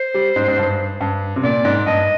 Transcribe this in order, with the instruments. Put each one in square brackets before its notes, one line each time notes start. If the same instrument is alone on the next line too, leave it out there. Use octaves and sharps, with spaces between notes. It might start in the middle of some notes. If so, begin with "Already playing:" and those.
Already playing: [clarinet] C5
[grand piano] G3
G#2
G#2
G2
G2
C3
[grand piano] A#2 [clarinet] D5
[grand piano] G#2
[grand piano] G2 [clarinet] D#5